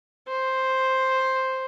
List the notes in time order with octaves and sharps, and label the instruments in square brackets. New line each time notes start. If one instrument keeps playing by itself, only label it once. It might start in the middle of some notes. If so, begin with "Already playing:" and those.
[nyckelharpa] C5